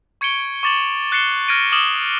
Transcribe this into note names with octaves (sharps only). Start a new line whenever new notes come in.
C#6 G#6 C#7 D7 G7
C#6 D6 A6 E7 F#7 G7
F#6 A6 C7 C#7 E7 G7
F6 G#6 A#6 D7 D#7
D6 D#6 F6 E7 F#7 G7